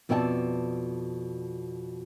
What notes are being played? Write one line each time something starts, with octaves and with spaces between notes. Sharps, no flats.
F2 B2 D5 E5 G5 A5